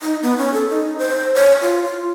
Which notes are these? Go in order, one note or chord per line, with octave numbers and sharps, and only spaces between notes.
D#4
B3
C#4
A4
D#4
C5
C#5
F4
F4